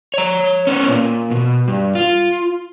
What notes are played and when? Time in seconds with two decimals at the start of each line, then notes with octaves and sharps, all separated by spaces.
0.14 C#5 A#5
0.67 B3 C#4
0.88 A#2
1.31 B2
1.68 G2
1.95 F4